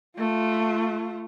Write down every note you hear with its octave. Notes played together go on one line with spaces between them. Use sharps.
A3 F4